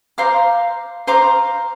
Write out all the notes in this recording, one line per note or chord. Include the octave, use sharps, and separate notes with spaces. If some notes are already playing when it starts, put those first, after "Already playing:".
C5 F5 A#5 D6
C5 F5 A#5 D6